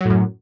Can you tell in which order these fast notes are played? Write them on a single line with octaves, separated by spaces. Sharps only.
F#3 A2 F#2